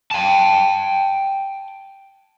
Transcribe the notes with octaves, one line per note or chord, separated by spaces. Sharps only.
G5 A5